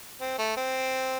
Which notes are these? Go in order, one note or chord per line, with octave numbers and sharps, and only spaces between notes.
C4
A3
C4